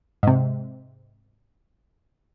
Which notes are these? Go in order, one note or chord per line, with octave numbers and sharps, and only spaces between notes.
G#2 C3